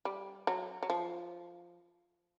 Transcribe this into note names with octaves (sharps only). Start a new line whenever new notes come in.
G3
F#3
F#3
F3